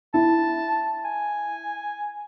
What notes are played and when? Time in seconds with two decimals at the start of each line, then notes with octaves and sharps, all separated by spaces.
0.14 E4 A5
1.04 G#5